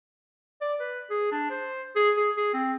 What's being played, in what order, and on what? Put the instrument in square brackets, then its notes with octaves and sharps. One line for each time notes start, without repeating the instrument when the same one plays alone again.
[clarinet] D5
B4
G#4
D4
C5
G#4
G#4
G#4
C4